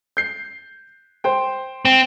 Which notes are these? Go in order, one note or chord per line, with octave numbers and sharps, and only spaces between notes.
G6 C7
C5 G5
C4